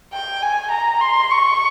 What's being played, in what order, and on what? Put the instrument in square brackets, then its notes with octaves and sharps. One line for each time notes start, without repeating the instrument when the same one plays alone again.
[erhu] G5
G#5
A#5
C6
C#6